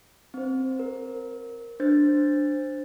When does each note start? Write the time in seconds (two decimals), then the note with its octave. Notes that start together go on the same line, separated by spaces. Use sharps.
0.34 C4 C5
0.79 A#4
1.80 D4 C5 G6 A6